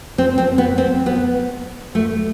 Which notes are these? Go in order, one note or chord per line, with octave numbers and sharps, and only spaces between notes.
C4
C4
B3
C4
B3
A3